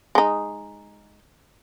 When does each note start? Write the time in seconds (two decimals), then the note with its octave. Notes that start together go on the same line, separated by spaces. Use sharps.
0.15 G#3 D#4